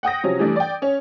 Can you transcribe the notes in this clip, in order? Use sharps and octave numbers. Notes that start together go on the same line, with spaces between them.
F#5 G5 D#6 A#6
C3 F3 F#3 C#4
E3 G3 A3 D4
D5 G5
C#4 C#5